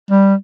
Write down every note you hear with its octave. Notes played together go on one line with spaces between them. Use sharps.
G3